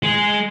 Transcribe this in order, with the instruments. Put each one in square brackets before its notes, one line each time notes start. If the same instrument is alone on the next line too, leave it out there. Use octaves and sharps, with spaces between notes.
[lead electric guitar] G#3